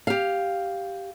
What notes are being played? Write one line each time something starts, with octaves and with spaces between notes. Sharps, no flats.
G4 F5